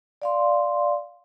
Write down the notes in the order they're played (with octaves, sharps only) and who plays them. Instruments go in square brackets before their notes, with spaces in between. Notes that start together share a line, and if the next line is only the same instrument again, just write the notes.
[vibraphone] D5 F5 C6